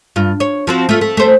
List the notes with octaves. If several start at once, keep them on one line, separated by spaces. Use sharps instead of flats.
G2 F4
C#5
F3 C4 F#4
A3 F4
A3
A3 C5